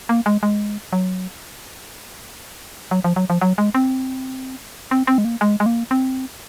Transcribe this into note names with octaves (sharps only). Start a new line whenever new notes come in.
A#3
G#3
G#3
F#3
F#3
F3
F#3
F3
F#3
G#3
C4
C4
C4
G#3
A#3
G#3
G#3
A#3
C4